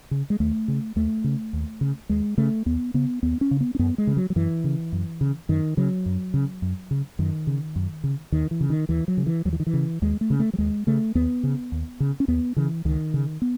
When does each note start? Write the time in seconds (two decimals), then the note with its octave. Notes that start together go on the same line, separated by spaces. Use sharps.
0.11 C#3
0.30 G#3
0.40 D#2 A3
0.68 C#3
0.96 D#2 A3
1.24 C#3
1.53 D#2
1.81 C#3
2.09 D#2 G#3
2.38 C#3 A3
2.66 D#2 B3
2.94 C#3 B3
3.23 D#2 B3
3.41 C#4
3.51 C#3
3.61 B3
3.75 C#4
3.79 F#2 B3
3.98 G#3
4.07 C#3
4.17 F#3
4.30 F#3
4.36 F#2 E3
4.64 C#3
4.92 F#2
5.21 C#3
5.49 F#2 D#3
5.77 C#3 F#3
6.06 F#2
6.34 C#3
6.62 F#2
6.91 C#3
7.19 F#2 D#3
7.47 C#3
7.76 F#2
8.04 C#3
8.32 D#2 D#3
8.51 E3
8.61 C#3
8.70 D#3
8.89 D#2 E3
9.08 F#3
9.17 C#3
9.26 E3
9.45 D#2 F#3
9.53 E3
9.60 D#3
9.67 E3
9.73 C#3
10.02 D#2 G#3
10.21 A3
10.30 C#3
10.39 A3
10.53 F#3
10.58 D#2 G#3
10.87 C#3 A3
11.15 D#2 B3
11.43 C#3
11.72 D#2
12.00 C#3
12.20 C#4
12.28 D#2 B3
12.56 C#3 E3
12.85 C#2 D#3
13.14 C#3
13.42 B3